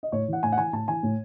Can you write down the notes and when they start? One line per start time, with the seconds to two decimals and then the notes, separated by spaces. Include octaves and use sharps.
0.03 D#5
0.12 A2 C#5
0.28 E3 F#5
0.43 A2 G#5
0.52 F#5
0.58 E3 G#5
0.73 A2 A5
0.88 E3 G#5
1.03 A2